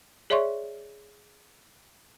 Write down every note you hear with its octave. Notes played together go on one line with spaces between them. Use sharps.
G#4 C#5 D5 E5 C6 C#6